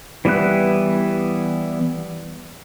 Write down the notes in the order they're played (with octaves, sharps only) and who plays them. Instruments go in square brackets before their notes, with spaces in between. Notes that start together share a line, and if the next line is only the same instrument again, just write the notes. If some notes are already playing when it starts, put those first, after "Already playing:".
[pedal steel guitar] E3 G3 B3 E4 F#6